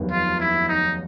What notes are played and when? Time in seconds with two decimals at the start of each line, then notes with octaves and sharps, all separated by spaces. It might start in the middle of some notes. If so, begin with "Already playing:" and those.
Already playing: F1 D#2 D#3 F#3 B3
0.11 F4
0.40 E4
0.68 D#4